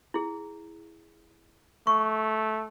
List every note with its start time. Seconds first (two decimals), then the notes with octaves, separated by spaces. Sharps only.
0.14 E4 G#4
1.87 A3 C#6